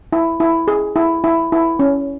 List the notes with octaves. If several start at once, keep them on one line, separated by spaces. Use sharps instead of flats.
E4
E4
G#4
E4
E4
E4
C#4